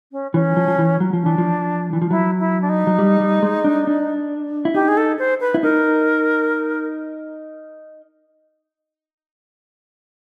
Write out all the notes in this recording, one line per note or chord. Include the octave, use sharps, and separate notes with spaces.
C#4
E3 C#4
F3
F3
E3
F#3
F3
E3 D4
F3
E3
F3
F#3 E4
E4
D4
D#4
F#3
G3
G3
G#3
D4
D4
E4
D#4 G4
G#4
A4
C5
B4
E4
D#4 A#4